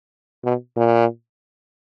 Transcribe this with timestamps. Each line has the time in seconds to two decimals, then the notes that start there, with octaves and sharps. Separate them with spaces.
0.45 B2
0.77 A#2